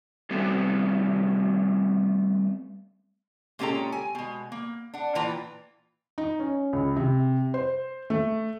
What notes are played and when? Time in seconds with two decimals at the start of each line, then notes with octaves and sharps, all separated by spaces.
0.31 G3 A3 B3 C4 A4
3.59 A#2 G#3 C#4 G4 A4 A#5
3.92 G#5
4.15 B2 G#3
4.52 A#3
4.94 D4 F#5
5.15 A#2 E3 F4 B4 G5 A#5
6.18 D#4
6.40 C#4
6.73 C#2
6.97 C3
7.54 C5
8.10 A3